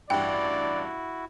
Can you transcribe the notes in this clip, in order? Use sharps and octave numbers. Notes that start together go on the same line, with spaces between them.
A1 G2 E4 F#4 D5 G5